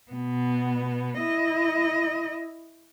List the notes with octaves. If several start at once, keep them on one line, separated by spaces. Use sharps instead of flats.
B2 B3
E4 D#5